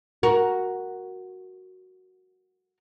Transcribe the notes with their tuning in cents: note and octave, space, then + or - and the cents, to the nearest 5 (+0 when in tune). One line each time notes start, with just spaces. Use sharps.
F#4 +0 A#4 +0